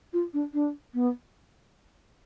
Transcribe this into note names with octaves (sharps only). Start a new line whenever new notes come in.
F4
D4
D4
B3